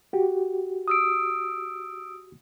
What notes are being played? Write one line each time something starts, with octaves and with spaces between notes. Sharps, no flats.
F#4 G4
D#6 E6 D7